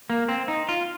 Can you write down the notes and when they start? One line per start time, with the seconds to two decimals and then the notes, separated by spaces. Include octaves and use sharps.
0.10 A#3
0.29 C4
0.48 D#4
0.69 F4